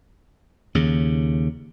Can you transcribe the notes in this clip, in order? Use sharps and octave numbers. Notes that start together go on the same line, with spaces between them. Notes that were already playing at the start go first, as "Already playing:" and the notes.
D#2 C#3